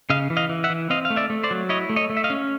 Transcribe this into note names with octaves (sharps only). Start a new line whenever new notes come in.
C#3 D#5 F5
E3
D#5 F5
E3
E5 F#5
E3
C4 D#5 F5
F5
A3
D5 E5
A3
C5 D5
F#3
E4 C#5 D#5
A3
C#5 D#5
A3
E5
D#5 F5
C#4